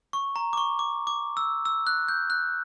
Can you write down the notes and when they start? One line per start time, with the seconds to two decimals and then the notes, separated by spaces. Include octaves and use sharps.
0.13 C#6
0.36 A#5
0.53 D6
0.57 C#6
0.79 D6
1.07 D6
1.37 E6
1.65 E6
1.87 F#6
2.09 G6
2.30 F#6